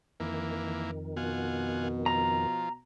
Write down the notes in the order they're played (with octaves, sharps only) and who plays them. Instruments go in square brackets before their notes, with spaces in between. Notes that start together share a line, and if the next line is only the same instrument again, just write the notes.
[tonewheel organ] F2 D#3 [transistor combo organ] E3 A#3
[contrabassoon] B2 [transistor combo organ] F4 F#5 G#5
[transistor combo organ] F3 [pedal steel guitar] A#5